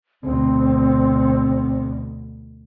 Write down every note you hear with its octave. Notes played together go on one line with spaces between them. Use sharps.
D2 B2 C4